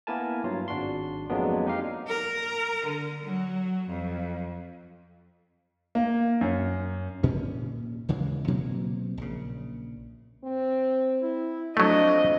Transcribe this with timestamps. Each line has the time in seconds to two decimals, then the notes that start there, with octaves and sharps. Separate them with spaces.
0.07 A#3 B3 E4 A#4 G#5 A5
0.44 G2 F#3 F4
0.68 G#1 D4 F#4 C6
1.29 F2 F#3 G#3 A#3 B3 D4
1.67 D#4 G4 F5
2.07 A#4
2.85 D3
3.23 F#3
3.89 F2
5.95 A#3
6.41 F#2
7.23 A#2 C#4
8.09 D#2 C#3 E3 G#3
8.48 B2 F#3 A#3 C4
9.18 A#1 C#3
10.44 C4
11.23 E4
11.77 F2 F#3 A3 D4 D#5